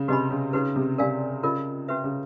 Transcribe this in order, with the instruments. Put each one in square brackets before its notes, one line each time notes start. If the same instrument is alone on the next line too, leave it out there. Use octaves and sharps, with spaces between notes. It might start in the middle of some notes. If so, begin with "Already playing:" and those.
Already playing: [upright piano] C#3
[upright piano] C3 [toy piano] F#4 B4 D#5 G#5 B5
[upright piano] C#3
[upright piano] C#3 [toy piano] D#4 F#4 B4
[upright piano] C3
[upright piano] C3 [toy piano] A#4 D5 F5 G#5
[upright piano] C#3 [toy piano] F4 A#4 D#5
[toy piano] C#4 F#4 B4 E5
[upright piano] C#3